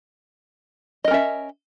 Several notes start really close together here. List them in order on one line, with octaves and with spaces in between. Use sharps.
D#5 A#4 C#4 E5